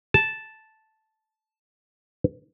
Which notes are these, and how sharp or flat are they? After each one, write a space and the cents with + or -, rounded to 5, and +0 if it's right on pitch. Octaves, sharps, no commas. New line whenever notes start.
A5 -5